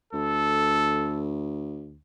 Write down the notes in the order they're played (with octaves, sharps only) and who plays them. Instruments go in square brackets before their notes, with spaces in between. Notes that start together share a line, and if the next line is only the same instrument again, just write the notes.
[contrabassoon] D2 [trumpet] A4